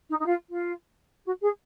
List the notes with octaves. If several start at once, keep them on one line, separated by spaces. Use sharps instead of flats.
D#4
D#4
F4
F4
F#4
G#4